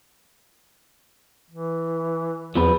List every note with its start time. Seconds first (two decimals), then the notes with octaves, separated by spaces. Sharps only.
1.50 E3
2.55 E2 F3 C4 B4